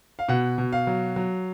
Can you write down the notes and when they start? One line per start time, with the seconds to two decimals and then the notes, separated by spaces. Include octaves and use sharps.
0.19 F5
0.28 B2 F#5
0.58 B2
0.73 F5
0.87 F#3
1.16 F#3